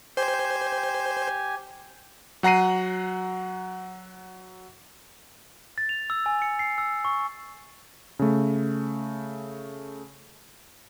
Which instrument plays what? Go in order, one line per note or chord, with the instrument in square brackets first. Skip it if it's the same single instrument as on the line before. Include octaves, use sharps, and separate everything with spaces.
[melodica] G4 G#5 [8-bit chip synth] C5
[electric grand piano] F#3 F#5 A#5 C7 D#7
[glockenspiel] A6
F7
E6
G#5
C#7
C7
E6
C#6
[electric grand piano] C#3 A3